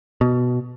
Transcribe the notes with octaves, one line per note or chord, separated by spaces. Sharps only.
B2